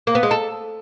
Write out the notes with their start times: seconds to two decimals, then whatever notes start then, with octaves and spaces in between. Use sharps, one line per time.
0.07 A#3
0.15 B3
0.23 G#3
0.31 A4